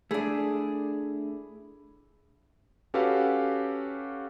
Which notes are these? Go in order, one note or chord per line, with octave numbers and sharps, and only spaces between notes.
A3 D4 E4 G#4
C#4 F#4 G4 A4 B4 F5